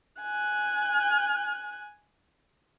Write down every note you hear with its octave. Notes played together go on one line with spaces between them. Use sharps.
G#5 F#6